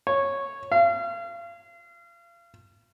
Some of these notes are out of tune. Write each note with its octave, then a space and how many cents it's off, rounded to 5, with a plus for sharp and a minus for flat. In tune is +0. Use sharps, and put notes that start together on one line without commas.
C#5 -10
F5 -35